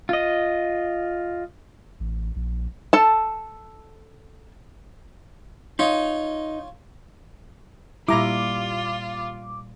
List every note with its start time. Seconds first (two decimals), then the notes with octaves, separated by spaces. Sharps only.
0.09 F4 D#5
2.00 A1
2.36 A#1
2.93 A4 A5
5.79 D#4 F4 C#5
8.08 A#2 G3 E4 F4 A#5 D6